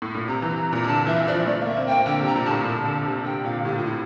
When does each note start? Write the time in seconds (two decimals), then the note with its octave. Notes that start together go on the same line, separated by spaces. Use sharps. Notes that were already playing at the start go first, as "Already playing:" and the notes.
0.02 A2
0.15 A#2
0.28 C3 A#5
0.42 E3
0.73 A#2
0.83 A#5
0.87 D3 A5
1.07 E3 E5
1.27 F3 D5
1.46 A3 D5
1.62 A#3
1.67 E5
1.77 C4
1.87 A#3 G5
2.06 D3 G5
2.21 C3
2.26 A#5
2.35 A#2
2.45 A5
2.51 A2
2.65 A#2
2.85 D3
3.05 C3
3.25 G5
3.45 A#2 F5
3.64 A2 G4
3.77 F4
3.85 E4